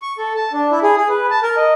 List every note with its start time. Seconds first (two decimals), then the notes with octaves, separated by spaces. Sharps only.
0.02 C#6
0.18 A4
0.35 A5
0.53 D4
0.71 E4
0.83 G#4
0.97 G#4
1.09 B4
1.30 A5
1.43 A#4
1.57 D#5